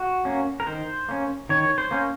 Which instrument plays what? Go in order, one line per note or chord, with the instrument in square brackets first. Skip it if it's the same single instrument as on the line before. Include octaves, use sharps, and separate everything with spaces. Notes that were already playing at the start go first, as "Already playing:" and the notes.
Already playing: [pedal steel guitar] F#4
A#3 C#4
A#4
D#3 C5
A#3 C#4
D#3 C#5
C5
A#3 C#4